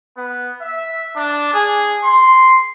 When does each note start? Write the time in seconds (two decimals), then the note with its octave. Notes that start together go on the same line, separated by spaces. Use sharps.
0.16 B3
0.61 E5
1.16 D4
1.54 G#4
2.03 C6